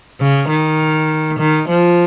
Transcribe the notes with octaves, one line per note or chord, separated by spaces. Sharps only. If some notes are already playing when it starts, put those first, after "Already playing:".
C#3
D#3
D#3
F3